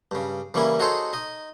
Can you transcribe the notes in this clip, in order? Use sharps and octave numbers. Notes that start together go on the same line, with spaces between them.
G2 C#3
C#3 E3 G3 A#3 C#4 E4
D#4 F#4 G#4 A4 C5 C#5
D#4 D#5